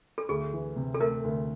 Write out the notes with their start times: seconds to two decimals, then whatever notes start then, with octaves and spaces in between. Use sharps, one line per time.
0.18 A4
0.29 D2 G#4
0.53 E3
0.76 C3
0.94 A4
1.00 A3 A#4
1.24 D2